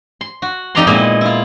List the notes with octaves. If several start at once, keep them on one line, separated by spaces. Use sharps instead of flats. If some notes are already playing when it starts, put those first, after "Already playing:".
C6
F#4
F2 D#4 G4 D5 A#5 C6
A#2 G#3 B3 D#4 E4
E4 F4